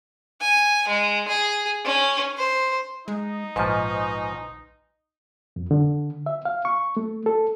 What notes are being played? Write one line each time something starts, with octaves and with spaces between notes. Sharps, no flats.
G#5
G#3
G#4
C#4
C5
G#3 D#4
A#1 G#2 F3 B4 G#5 C#6
F2
D3
E5
F5
C#6
A3
A4